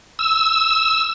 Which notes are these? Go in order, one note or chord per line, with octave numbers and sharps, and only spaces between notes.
E6